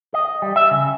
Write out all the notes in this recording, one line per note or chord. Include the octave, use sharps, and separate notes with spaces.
D#5
G3
E5
C#3